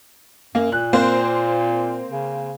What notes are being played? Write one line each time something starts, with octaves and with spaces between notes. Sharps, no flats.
F#2 A#3
A#2 F#6
A#3 C4 C5
C#3